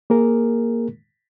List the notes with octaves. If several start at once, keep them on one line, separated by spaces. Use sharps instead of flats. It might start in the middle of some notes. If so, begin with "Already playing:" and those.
A#3 G#4 A#4